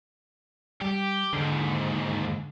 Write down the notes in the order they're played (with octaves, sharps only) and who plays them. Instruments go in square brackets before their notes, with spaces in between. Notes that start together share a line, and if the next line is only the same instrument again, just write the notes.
[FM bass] G3 [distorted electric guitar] G4
[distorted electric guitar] D#2 G#2 [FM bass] D3